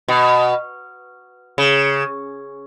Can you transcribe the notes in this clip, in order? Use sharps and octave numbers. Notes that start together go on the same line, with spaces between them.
B2
C#3